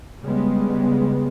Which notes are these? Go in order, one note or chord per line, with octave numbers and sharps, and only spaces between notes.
C#3 G3 G#3 B3